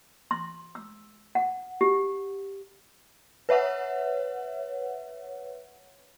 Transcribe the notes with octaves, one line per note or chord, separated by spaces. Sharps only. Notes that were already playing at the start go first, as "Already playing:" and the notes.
C6
E6
F#5
G4
B4 C#5 E5 F#5